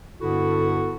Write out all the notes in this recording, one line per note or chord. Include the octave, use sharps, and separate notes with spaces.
G2 D3 B3 E4 F#4 A4